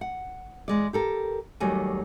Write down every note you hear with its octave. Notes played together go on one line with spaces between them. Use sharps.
F#5
E2 G#3 D5
G4 A4 A#4
D#2 F#3 G3 A3 G#5